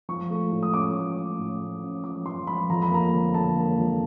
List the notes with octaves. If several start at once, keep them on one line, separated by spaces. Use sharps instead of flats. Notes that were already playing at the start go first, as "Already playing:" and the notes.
F3 C#6
A3
A2
D#6
C#4 D6
A3
C#4
A2
A3
C#4
F3 D6
F3 C6
F3 B5
F2 A#5
B5
A#3 A#5
D3
D3 A5
A#3
F2